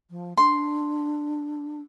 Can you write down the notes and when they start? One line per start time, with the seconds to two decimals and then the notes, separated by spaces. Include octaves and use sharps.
0.10 F3
0.37 D4 C6